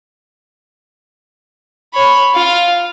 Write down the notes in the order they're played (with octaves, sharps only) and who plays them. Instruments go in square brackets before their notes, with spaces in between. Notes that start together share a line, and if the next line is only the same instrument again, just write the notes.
[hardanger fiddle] C#5 B5
F4 F5